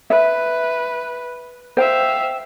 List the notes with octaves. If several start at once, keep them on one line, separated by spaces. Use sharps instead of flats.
B4 E5
C5 E5 F5 G5